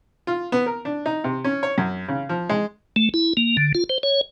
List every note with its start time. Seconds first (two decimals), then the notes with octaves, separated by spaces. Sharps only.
0.27 F4
0.52 B3
0.66 A#4
0.85 D4
1.06 D#4
1.24 C3
1.44 C#4
1.63 C#5
1.78 F#2
2.08 C#3
2.29 F3
2.50 G#3
2.96 A3
3.14 E4
3.37 A#3
3.57 D3
3.75 F4
3.90 C5
4.03 C#5